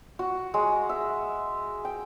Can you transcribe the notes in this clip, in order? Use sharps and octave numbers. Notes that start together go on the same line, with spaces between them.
F#4
G#3
E5
G5